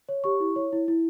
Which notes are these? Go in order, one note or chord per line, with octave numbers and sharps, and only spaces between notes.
C#5
G4 C#6
E4
C#5
E4
E4